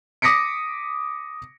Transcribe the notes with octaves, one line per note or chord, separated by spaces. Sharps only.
D6 D#6 A#6 B6 C#7 D7